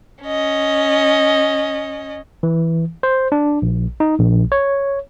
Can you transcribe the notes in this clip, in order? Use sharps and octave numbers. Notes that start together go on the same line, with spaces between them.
C#4 D#5
E3
C5
D4
A#1
D#4
A#1
C#5